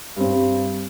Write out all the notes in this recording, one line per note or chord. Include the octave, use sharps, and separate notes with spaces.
G2 C4